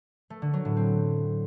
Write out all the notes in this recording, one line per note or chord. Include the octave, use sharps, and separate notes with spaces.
A3
D3
F#3
A2
C4